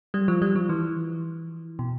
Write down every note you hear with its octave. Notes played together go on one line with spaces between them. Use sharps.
G3
F3
G3
F3
E3
B2